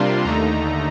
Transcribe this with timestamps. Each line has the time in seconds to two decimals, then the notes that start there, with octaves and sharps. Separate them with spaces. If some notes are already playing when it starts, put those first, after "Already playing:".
Already playing: C3 G3 A#3 D4 F4 C6
0.24 D#2 D3 A3 D#4 A#5